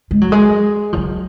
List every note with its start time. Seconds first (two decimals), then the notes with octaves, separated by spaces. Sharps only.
0.11 G#3
0.21 F#3
0.32 G#3
0.93 F3
0.97 F#3